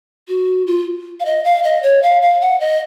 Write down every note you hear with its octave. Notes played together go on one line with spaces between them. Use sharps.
F#4
F4
F5
D#5
F5
D#5
C#5
F5
F5
F#5
D#5